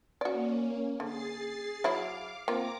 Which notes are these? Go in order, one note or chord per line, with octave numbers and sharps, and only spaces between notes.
A#3 C#4 F#4 D5
D3 G#4 A6 C7
F#3 E4 F5 D6
A#3 C4 F4 A#5 D6